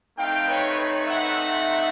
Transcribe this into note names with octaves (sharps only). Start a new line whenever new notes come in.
A3 C4 D#4 F5 G5
B4 C#5
B4 C#5
E5 F#5